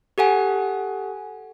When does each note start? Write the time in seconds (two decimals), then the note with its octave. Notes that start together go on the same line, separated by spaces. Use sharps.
0.18 G4 A4 F#5 G#5